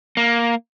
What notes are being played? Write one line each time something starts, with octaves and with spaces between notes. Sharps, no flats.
A#3